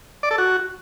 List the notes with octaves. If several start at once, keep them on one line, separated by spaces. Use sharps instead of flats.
D5
A4
F#4